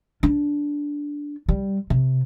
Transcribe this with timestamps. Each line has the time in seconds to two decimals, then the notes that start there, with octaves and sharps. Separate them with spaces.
0.23 D4
1.49 G3
1.90 C3